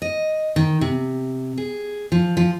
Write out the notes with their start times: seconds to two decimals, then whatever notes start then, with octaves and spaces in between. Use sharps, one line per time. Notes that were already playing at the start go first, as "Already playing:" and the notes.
0.02 D#5
0.56 D#3
0.81 C3
1.58 G#4
2.12 F3
2.37 F3